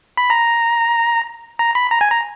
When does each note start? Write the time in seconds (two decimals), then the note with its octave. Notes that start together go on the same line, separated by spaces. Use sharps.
0.17 B5
0.30 A#5
1.59 A#5
1.75 B5
1.91 A#5
2.01 G#5
2.12 A#5